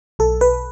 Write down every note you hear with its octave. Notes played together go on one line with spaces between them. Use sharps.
B1 A4
B4